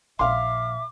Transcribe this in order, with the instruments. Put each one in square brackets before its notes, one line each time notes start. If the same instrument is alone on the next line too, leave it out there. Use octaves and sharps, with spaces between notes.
[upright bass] A#1 [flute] E5 [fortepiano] F5 C6 [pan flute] D6